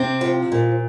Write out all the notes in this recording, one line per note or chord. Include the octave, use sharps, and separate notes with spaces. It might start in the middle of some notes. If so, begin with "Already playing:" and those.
Already playing: C3 C4
F3
A#2